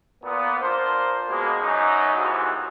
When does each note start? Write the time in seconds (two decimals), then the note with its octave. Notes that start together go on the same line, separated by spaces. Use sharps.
0.24 A#2 B3
0.61 D4 F4 A#4 C5
1.28 B2 G#3 A#3
1.61 F#2 D#4
2.15 D#2 C3 E3 F3 G#3 F#4